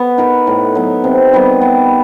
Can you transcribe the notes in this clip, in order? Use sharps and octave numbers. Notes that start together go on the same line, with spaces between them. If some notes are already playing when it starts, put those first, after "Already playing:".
Already playing: B3
D#4 F#4 A#4
A2
F#3 B3
C3
D#3 G3 B3
B3